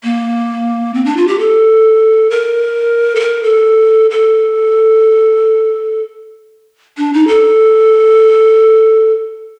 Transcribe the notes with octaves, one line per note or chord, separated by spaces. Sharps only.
A#3
C4
D4
F4
G4
A4
A#4
A4
A#4
A4
A4
D4
D#4
A4